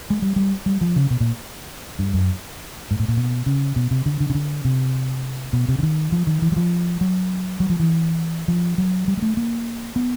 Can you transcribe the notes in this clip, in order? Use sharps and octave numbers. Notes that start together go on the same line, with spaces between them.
G#3
G3
G3
G3
F3
C#3
B2
A#2
G2
F#2
G#2
A2
A#2
B2
C#3
B2
C3
D3
D3
C#3
D3
C3
B2
C3
D3
D#3
F3
D#3
E3
F#3
F3
F#3
F#3
F3
E3
F3
F#3
G3
G#3
A3
A#3
B3